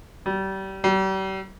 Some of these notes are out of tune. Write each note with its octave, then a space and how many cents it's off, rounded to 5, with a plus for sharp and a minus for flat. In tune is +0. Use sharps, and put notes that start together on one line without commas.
G3 -30
G3 -40